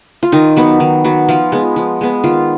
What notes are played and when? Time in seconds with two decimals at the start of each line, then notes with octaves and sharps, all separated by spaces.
0.23 F4
0.32 D#3 D#4
0.56 F#3 B3
0.80 D#3
1.04 F#3 B3
1.29 F3 F4
1.52 G#3 B3
1.76 F3
2.01 G#3 B3
2.24 D#3 F4